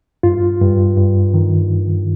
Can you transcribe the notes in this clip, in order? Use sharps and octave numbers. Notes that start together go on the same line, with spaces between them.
G2 F4
G2
G2
D#3